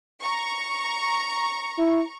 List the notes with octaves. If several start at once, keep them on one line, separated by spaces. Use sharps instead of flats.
A#5 C#6
E4